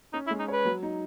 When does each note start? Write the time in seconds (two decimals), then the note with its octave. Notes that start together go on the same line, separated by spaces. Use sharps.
0.13 C#4 D#4
0.27 E4
0.30 G#3
0.39 D#4
0.48 B4 C#5
0.65 F#3
0.83 D#4